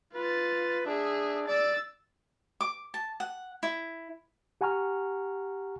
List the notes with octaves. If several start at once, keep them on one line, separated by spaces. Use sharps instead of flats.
F4 B4 A6
D4 G#4 E5
D5 E6 A6
D6
A5
F#5
E4
G4 F#5 G#5 A#5 C#6 F6